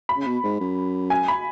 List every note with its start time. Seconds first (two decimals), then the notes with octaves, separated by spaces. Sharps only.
0.09 B5
0.17 C#3
0.26 B2
0.43 G#2
0.60 F#2
1.10 G#5
1.28 B5